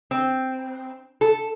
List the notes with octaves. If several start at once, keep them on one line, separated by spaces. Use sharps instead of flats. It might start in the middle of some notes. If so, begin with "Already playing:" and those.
C4
A4